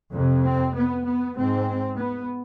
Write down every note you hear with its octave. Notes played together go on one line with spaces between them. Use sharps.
F2 C3
C4
B3
B3
G#2 C4
B3